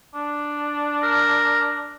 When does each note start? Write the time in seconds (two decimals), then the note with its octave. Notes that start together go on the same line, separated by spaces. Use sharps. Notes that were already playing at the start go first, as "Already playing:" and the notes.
0.15 D4
1.03 A#4